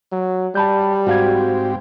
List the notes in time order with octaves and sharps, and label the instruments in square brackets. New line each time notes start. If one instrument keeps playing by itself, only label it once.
[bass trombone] F#3
[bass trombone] G3 [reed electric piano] A5 B5 G6
[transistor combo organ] G#2 C4 G4 [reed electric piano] F#4 F5 G#6